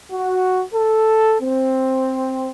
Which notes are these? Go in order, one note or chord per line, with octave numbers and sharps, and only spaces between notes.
F#4
A4
C4